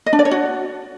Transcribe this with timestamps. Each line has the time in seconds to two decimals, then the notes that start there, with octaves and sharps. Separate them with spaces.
0.06 D#5
0.13 D4
0.19 D5
0.25 C#5
0.31 F#4